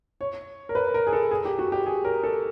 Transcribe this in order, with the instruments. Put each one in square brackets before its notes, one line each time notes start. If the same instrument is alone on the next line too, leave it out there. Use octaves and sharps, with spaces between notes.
[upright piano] C#5
A#4
B4
A#4
G#4
A4
G#4
G4
F#4
G4
G#4
A#4
A4